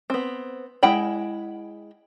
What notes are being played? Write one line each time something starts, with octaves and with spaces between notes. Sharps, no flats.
B3 C4
G#3 E4 F#5 G5 B5